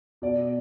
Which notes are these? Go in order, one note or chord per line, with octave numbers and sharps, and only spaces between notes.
B2 D5